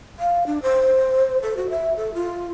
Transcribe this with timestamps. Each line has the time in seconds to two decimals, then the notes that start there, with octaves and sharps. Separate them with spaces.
0.19 F5
0.46 D4
0.63 C5
1.43 A4
1.57 F#4
1.70 E5
1.97 A4
2.14 F4